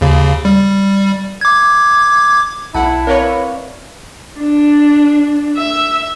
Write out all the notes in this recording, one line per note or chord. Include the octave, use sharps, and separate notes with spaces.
D#2 C#3
G3
D6 G#6
B1 E4 F#5 A5
C4 A#4 B4 C#5 D5 F5
D4
E5